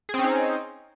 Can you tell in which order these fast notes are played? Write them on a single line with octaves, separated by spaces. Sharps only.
G#4 C4 C#4 D#4